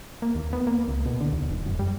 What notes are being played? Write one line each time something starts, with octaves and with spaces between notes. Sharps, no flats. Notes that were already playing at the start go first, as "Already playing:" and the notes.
A#3
D#2
B3
A#3
C#2
B2
D3
D#2
E1
F#2
G3